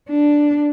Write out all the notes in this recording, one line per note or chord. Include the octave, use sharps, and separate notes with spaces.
D4